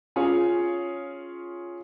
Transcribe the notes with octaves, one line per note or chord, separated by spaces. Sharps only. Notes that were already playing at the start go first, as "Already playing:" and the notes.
C#4 F4 G#4 C#5